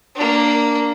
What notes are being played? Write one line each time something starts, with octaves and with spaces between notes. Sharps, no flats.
A#3 D4